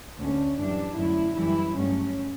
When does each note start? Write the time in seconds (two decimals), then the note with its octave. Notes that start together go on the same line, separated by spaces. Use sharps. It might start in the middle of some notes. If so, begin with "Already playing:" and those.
0.19 D2 D3 A3 C#4
0.58 F#2 E3 G3 D4
0.97 F#2 D3 A3 E4
1.36 F#2 E3 G3 E4
1.75 G2 F#3 A3 C#4